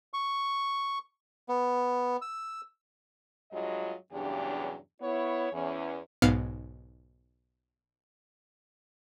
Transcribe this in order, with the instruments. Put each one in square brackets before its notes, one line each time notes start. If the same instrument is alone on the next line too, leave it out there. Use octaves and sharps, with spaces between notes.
[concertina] C#6
B3
E6
[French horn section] G2 F#3 G#3 F4 D#5
E2 G2 C#3 F#3 D4 G4
B3 E4 C#5
E2 E3 C#4
[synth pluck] B1 G#2 B3 F5 F6 C#7